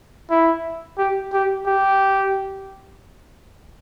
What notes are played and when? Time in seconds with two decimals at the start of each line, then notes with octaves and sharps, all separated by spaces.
0.30 E4
0.98 G4
1.33 G4
1.67 G4